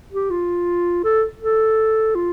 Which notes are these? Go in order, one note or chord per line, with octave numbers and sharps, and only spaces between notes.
G4
F4
A4
A4
F4